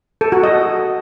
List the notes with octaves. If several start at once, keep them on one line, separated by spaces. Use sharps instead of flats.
A4
F#4
D#5